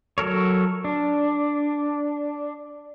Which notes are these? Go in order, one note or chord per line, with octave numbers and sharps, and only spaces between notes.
F#3 A4 A#4 C#5
D4